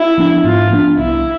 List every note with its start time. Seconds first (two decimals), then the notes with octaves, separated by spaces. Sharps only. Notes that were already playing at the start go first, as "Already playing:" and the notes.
Already playing: E4
0.18 F3 B3 D4
0.44 G#2 F4
0.71 F3 B3 D4
0.97 C2 E4